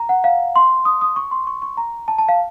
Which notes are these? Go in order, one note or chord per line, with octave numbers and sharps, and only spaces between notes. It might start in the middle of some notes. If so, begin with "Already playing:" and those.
Already playing: A#5
F#5
F5
C6
D#6
D#6
C#6
C6
C#6
C#6
A#5
A5
A5
F5